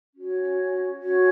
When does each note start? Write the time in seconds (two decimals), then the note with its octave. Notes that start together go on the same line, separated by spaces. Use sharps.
0.15 C#4 F#4 C#5
1.01 C#4 F#4 C#5